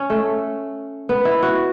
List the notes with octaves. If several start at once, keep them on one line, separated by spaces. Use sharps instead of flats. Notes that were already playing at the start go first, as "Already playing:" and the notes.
Already playing: C#4
A3
B3
E4
F#4